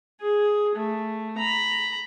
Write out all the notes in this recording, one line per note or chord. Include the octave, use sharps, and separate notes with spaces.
G#4
A3
A#5 B5